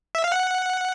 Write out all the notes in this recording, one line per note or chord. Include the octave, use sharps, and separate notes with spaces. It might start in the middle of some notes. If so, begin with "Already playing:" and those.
E5
F5
F#5